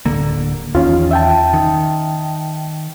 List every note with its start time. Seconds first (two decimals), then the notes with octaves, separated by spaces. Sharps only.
0.05 D1 D3 A#3
0.75 E2 D#3 C#4 F4
1.11 E5 G5 A5
1.53 D#3